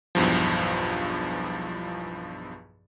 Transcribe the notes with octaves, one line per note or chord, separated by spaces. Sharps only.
B1 E2 G2 F3